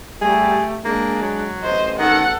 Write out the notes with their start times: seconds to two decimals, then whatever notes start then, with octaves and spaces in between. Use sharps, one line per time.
0.21 G3 A3 G4 G#4
0.85 G#3 A#3 D4
1.22 F#3
1.64 A1 C5 D#5
1.99 D#3 A4 F#5